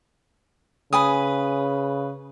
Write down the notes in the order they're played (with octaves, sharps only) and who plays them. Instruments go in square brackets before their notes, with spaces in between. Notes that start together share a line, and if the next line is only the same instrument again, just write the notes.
[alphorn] C#3 [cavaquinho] B4 G#5 D#6